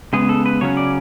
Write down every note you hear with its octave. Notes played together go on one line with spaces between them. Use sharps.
C#3 G#3 B3 G#4
A4
B4
C#3 F#3 C#4 C#5
D5